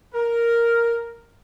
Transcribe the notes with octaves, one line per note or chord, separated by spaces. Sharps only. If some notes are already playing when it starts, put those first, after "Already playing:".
A#4